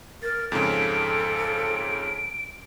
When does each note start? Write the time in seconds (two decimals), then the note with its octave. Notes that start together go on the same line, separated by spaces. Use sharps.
0.22 A#4 A6
0.52 F2 G#2 C#3 A4 D7